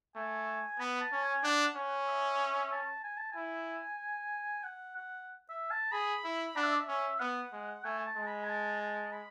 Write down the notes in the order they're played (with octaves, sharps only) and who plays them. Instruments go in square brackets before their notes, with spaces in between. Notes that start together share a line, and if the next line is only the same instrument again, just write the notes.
[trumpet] A3 [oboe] G#5
[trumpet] B3 [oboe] B5
[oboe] A5
[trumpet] C#4
[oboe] G#5
[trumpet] D4 [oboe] F#5
[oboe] F#5
[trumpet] C#4
[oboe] E5
A5
G#5
A5
[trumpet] E4 [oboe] G#5
[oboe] F#5
F#5
E5
A5
[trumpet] G#4 [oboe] B5
[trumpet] E4
[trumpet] D4 [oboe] F#5
[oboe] E5
D5
E5
[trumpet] C#4
[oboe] E5
[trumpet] B3 [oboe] F#5
[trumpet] G#3
[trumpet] A3 [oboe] G#5
[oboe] G#5
A5
[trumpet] G#3
[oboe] B5
G#5
A5
A5
B5